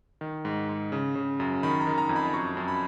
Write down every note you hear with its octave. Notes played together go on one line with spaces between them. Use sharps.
D#3
G#2
G#2
C#3
C#3
F#2
D#3 B5
A#5
D#3
A#5
F2
B5
F#2 C#6
F#2
B5